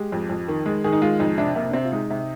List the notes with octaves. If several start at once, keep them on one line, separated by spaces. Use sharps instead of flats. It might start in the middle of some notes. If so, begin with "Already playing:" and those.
Already playing: G#3 G4
F2
F2
D#3
G#3
D#3 G#4
D#4
G#3 F4
F2 D#4
C3 D4
C3 A#3
D4
C3 C4
F4
G#3 D#4
C3